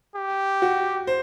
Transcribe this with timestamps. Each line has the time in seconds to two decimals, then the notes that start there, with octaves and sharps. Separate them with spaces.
0.15 G4
0.62 F#4
1.07 C5